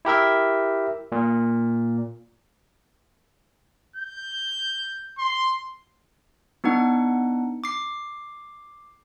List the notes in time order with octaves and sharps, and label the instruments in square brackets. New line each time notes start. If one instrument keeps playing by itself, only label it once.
[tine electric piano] E4 G4 A#4 E5
A#2
[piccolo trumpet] G6
C6
[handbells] B3 D4 D#4 F#5
D6 C7